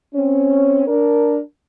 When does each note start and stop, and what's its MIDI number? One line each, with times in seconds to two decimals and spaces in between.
0.15 0.86 60
0.15 0.86 61
0.88 1.39 62
0.88 1.39 70